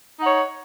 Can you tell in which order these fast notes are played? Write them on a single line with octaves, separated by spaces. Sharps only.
D#4 F#5 C#5